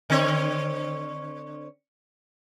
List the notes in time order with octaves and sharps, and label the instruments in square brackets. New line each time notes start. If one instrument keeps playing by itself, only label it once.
[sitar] D3 C4 C#5